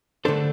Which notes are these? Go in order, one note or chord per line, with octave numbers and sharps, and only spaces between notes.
D3 A3 D4 A4 C5